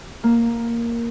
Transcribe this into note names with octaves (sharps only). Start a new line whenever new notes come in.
A#3